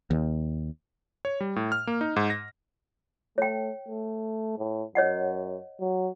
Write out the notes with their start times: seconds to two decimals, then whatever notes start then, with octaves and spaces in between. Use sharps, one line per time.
0.11 D#2
1.25 C#5
1.41 G3
1.56 A2
1.72 F6
1.87 A#3
2.01 D#4
2.16 G#2
2.30 A#6
3.38 A3 C#5 G5
3.88 A3
4.58 A2
4.95 F#2 C#5 D#5 F#5
5.80 F#3